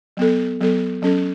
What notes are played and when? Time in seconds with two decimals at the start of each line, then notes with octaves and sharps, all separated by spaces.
0.17 F#3 B3 A4
0.61 F#3 B3 A4
1.02 F#3 C#4 A4